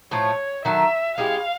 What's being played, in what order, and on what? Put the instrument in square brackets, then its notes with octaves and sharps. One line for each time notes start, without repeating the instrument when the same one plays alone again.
[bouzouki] A2 F3 A3 [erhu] C#5
[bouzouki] D#3 F#3 A3 [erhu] E5
[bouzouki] G#3 C#4 E4 G4 [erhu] F5